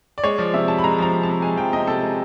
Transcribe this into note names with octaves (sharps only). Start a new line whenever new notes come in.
D5
G#3 C#5
F3 D5
C3 E5
C3 A5
B5
G#3 A#5
F3 A#5
C3
A5
C3
G#3 G#5
F3 G5
C3 D#5
C3 A4
G#3